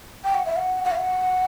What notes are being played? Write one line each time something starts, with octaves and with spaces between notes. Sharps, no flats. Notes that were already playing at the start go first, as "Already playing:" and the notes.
G5
F#5
E5
F#5
F#5
E5
F#5